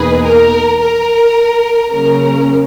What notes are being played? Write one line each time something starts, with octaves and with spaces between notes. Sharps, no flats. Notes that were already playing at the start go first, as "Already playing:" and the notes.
Already playing: E2 B2 A#3 D#4 G#4 B4
A#4
A#4
C#3 F#3 A#3 C#4 A#4